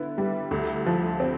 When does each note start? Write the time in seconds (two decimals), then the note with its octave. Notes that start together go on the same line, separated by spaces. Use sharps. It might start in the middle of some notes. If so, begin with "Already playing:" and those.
Already playing: D3 B3 E4
0.18 G3
0.51 D2
0.86 F3
1.20 C4